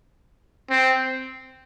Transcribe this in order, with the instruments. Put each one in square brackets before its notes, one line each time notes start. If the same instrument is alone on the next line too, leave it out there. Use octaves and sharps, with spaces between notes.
[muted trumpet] C4